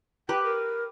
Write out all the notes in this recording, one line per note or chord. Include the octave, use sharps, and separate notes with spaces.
G4 B4 G5
A#4